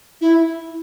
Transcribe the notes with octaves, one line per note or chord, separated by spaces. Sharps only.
E4